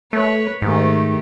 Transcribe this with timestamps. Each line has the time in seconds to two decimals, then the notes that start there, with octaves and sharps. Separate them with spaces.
0.13 A3 B4 C#5
0.62 G#2 D#3 A3 G4